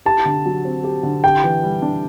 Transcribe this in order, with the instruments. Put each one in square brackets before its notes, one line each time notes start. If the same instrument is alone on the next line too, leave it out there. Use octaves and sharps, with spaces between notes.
[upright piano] G4 [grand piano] A5
[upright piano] D3
F#3
C4
G4
D3
[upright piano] G4 [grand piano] G5
[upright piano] E3
G3
D4